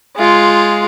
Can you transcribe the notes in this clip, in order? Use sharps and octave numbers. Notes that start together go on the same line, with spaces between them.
G#3 F4